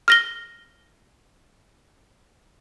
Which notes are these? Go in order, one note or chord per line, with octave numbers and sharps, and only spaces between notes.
F6 A#6 G7